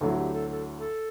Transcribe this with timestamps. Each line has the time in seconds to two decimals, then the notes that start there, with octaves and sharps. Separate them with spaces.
0.01 D2 D3 F#3 A3 E4 A4
0.11 F#4
0.18 G4
0.34 A4
0.51 A4
0.76 A4